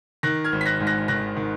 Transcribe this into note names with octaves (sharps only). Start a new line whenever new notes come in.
D#3 F#6 A#6
F6 G#6
G#1
B6
F#6 A#6
G#2
F#6 A#6
D#3 F#6 A#6
D#3